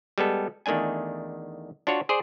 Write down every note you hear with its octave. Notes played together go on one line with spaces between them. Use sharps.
G3 G#3 B3 A4
E2 D#3 A3 D4 G#5
D4 F4 F#4 C#5
G#4 C5 D5